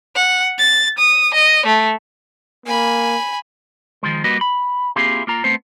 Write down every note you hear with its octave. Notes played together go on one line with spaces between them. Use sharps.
F#5
A6
D#6
D#5
A3
A#3 G#5 B5
D#3 F3 G#3
G3 A#3 F#4 B4 D#5
B5
A#3 C4 E4 F4 G4 G#4
A#3 F4 A#5
A3 B3 C4 C5